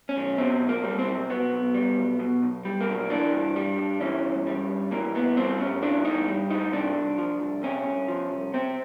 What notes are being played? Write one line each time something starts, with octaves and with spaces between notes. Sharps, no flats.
C#4
B1
B2 C4
B1
A#3
G3
C4
B1
B2 B3
B1
G3
B1
B2
B1
G3
A#3
B1
E3 D4
G2
G3
G2
E3 C#4
G2
G3
G2
E3 A#3
G2 B3
G3 C4
G2 C#4
E3 D4
G2 D#4
G3
G2 D#4
C3 D4
C2
F3
C2
C3 C#4
C2
F3
C2
C3 C4